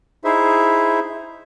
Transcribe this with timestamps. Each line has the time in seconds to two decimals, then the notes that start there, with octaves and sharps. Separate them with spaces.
0.24 D#4 E4 G#4 C5 E5